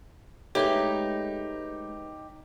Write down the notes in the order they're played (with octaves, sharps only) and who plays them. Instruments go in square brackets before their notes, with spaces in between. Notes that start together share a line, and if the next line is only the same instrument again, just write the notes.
[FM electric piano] G#3 A3 B4 [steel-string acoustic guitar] D#4 [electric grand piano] G4 [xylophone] C#5 E5 G7